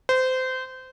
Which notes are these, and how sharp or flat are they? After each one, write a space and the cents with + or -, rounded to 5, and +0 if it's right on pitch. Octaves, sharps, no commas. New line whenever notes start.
C5 -25